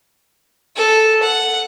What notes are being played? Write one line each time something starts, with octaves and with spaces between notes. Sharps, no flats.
A4
F#5